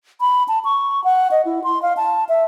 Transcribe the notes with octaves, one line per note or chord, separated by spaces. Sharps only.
B5
A5
C#6
F#5
D#5
E4
C6
F5
A5
E5